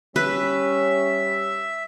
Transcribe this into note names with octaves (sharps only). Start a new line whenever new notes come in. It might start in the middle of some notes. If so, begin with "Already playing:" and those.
G3 C#4 B4 E5